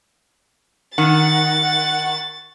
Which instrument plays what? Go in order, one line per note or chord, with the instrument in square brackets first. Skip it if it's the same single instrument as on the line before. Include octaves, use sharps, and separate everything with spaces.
[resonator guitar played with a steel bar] D#3 [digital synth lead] F#5 [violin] A6